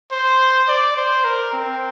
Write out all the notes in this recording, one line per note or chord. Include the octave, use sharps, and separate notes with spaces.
C5
D5
C5
A#4
C4